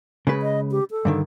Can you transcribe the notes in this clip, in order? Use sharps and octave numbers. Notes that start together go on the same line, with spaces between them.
C#3 G#3 B4
D#5
G4
A4
G2 D3 D#3